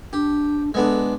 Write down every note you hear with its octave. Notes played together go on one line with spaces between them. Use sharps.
D4 G4
G#3 B3 D4 A4